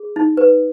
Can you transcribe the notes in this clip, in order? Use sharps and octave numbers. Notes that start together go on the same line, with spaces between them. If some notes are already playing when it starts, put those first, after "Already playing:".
Already playing: G#4
D#4
B4